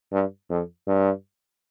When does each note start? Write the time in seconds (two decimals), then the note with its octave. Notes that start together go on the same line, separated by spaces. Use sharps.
0.12 G2
0.50 F2
0.87 G2